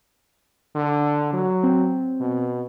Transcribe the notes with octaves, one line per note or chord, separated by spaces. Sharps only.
D3
F#3
C4
B2